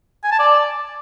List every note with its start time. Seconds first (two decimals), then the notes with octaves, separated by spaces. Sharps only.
0.24 G#5
0.32 A5
0.39 D5